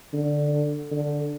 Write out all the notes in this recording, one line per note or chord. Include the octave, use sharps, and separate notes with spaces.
D3
D3